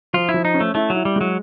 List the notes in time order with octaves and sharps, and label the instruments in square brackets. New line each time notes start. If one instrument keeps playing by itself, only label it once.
[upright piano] F3 [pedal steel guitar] F4
[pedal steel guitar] E4
[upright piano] F3
[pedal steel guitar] D#4
[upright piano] C#4
[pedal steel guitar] A3
[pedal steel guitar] A3 [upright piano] E4
[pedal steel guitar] F#3 [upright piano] E4
[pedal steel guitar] G3
[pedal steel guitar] F#3 [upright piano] G#3